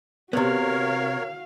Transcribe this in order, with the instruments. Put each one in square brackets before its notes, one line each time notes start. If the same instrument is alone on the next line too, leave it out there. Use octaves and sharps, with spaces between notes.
[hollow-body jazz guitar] C3 B3 [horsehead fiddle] F#4 F5 [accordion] A#4 C#5